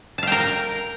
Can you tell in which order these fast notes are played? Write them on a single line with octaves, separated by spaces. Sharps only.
A5 F5 G5 A#4